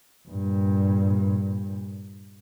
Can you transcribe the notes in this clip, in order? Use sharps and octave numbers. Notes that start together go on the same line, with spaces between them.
G2 A#2